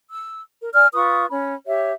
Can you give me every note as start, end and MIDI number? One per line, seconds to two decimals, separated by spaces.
0.10 0.41 88
0.61 0.71 70
0.74 0.87 74
0.74 0.87 80
0.74 0.87 89
0.94 1.25 65
0.94 1.25 71
0.94 1.25 85
0.94 1.25 87
1.29 1.56 61
1.29 1.56 83
1.66 1.92 67
1.66 1.92 73
1.66 1.92 76